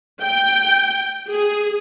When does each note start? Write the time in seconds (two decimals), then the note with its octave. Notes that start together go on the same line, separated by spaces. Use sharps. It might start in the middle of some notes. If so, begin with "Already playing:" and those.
0.23 G5
1.31 G#4